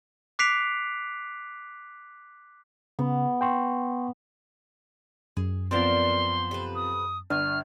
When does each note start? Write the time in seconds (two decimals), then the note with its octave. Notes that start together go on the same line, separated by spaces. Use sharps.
0.39 D6 F#6 B6 C7 D7 F7
2.99 C#3 B3
3.41 G5 C6 C#6
5.37 F#2 G#4
5.71 F3 B3 C4 A#4 D5 A5 C6
6.51 C3 A4 B4
6.75 D#6
7.30 G1 B3 D4 F6